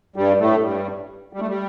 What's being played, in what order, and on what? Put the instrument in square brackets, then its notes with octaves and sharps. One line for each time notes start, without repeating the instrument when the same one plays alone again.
[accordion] G2 G3
A2 A3
G2 G3
G3
A3
G3